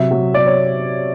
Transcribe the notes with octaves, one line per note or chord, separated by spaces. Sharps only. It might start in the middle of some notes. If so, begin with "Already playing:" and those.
Already playing: C3 F#3 E5
F#3
F#3 D5
C#5